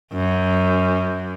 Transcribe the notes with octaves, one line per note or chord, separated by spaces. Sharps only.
F#2